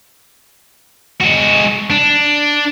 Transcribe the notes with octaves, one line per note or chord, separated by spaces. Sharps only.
G#3 F#4
D4